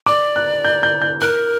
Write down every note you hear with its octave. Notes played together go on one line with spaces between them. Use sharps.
D5 D6
F#6
G6
G6
G6
A#4 F#6